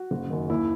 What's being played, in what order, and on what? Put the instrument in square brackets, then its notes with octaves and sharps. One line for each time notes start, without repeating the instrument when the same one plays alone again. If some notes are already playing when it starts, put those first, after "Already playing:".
Already playing: [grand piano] F#4
F#1
F#2 D#3
D#2 E4